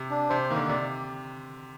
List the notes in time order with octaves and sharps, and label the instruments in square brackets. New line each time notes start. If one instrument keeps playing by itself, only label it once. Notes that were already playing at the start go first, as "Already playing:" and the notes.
Already playing: [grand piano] C3
[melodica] D4
[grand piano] C3 [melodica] C5
[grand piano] D#3 [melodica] A#3
[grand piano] D3
[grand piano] C3 [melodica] D5